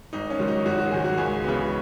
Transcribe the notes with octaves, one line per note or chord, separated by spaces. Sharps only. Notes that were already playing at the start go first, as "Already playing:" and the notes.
G#1 D#4
C#4
G#2 D#3 F#3
D#4
G#1 F#4
F#4
G#2 D#3 F#3 G#4
F#4
C#2 G#4
C#3 E3 B3